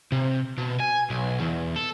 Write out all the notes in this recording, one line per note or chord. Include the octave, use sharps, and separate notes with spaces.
C3
B2
G#5
B1
E2
A4